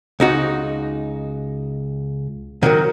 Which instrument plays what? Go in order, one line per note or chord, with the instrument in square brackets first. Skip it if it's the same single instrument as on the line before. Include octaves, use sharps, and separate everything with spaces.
[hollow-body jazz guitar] C#2 D#4 F#4
[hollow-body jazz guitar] D#3 E3 F#3 [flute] A#4